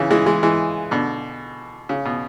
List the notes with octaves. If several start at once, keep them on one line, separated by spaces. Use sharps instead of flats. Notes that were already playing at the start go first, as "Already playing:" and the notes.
Already playing: C#3 E3
E3 G#3
E3 G#3
E3 G#3
B2 D3
C#3
B2